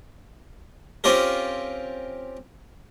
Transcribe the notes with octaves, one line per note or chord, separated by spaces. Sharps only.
C4 C#4 F4 G4 A#4